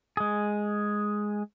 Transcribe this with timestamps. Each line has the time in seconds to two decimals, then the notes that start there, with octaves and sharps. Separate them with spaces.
0.17 G#3 G#4